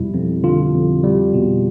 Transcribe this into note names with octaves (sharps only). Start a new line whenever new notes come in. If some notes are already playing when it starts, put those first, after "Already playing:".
Already playing: F2 B2 G3 E4
F2
D3 F4
F2
G3
B2